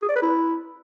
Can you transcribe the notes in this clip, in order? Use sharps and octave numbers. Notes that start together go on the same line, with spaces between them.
G#4
D5
B4
E4